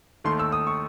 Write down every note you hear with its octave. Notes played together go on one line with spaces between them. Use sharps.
D#2 D#3 A3 C6
E6
D#6
C#6